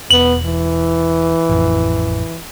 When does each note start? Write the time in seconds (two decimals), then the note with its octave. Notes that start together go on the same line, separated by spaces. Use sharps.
0.11 E1 B3 F#7
0.46 E3
1.49 A1 F2